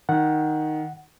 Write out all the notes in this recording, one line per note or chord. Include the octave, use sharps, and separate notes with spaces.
D#3 F#5